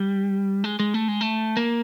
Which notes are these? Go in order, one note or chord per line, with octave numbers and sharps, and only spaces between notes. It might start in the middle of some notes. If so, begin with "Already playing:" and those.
Already playing: G3
G#3
G#3
A3
G#3
A3
A#3